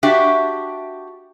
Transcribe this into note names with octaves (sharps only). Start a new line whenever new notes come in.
D4 F#4 G4 E5